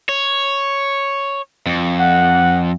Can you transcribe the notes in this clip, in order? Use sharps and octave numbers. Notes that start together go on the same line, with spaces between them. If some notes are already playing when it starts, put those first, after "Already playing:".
C#5
F2
F#5